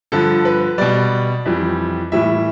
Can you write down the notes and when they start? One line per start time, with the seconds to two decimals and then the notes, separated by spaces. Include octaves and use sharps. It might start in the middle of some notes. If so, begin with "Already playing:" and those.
0.12 G2 D3 F3 A4
0.45 B4
0.78 B2 G3 D5
1.45 F2 E3 G3
2.12 A2 E3 G3 E5